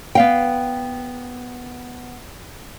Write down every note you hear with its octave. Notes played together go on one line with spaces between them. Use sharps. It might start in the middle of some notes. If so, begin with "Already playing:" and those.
B3 F5 G5